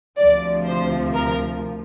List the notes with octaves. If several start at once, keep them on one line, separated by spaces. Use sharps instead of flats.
D2 C3 F3 D5
C5
A#4